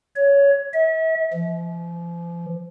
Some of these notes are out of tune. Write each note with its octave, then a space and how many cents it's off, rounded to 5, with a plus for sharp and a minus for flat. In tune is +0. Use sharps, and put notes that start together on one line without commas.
C#5 +15
E5 -40
F3 -35